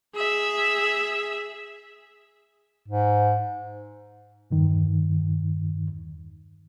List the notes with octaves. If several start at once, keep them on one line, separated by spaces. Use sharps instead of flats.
G#4 E5
G#2
E2 G2 D#3